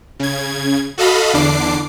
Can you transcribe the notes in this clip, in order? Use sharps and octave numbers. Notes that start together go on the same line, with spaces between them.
C#3 G#6
F#4 A4 D#5 F5 B5
E2 D3 D4 D6 C7